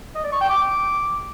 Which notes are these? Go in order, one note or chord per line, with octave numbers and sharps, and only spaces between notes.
D#5
D5
C#6
G5
D6